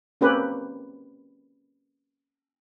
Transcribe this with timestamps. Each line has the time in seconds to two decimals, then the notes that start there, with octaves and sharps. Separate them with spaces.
0.21 A#3 C4 C#4 G4 B4